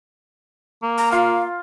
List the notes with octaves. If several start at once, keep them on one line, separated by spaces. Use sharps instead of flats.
A#3
A#5
F4 F5